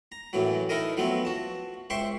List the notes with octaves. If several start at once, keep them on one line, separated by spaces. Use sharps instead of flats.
A#5
F#2 A2 E3 F#3
D#4 E4 A4 A#4 D#5
F3 F#3 A3 B3 C4
F#4 A5
C#2 C5 E5 G5 C6 C#6